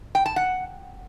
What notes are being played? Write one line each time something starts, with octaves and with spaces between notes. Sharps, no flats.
G5
A5
F#5